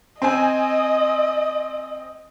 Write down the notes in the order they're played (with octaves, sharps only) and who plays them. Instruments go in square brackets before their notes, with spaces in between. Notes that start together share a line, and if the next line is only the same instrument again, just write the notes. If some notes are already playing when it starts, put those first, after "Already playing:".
[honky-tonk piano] C4 G#5 [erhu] D#5